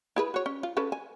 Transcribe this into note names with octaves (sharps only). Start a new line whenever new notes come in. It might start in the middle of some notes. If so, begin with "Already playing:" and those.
E4 G#4 B4
F#4 C#5
C#4
F4
C#4 A4 B4
G#5